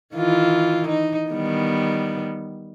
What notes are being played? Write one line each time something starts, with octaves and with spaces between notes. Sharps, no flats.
D#3 E3 F4
D#4
D#3 G3 B3